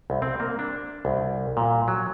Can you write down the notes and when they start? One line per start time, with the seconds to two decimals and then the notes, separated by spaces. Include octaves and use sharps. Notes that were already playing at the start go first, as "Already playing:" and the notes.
0.10 C2
0.22 C4
0.40 A#3
0.59 D4
1.05 C2
1.57 A#2
1.88 F#3